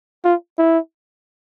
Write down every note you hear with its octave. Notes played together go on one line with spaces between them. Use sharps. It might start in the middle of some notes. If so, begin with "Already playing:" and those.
F4
E4